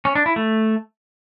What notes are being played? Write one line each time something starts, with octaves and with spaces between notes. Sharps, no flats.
C#4
D4
E4
A3